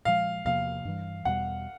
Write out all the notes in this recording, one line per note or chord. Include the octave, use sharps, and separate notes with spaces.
A#2 F3 G#3 F5
E2 C3 F3 A#3 F5
G2 E3 G3
E2 B2 G3 F#5